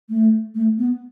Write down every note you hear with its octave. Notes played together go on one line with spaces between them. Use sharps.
A3
A3
B3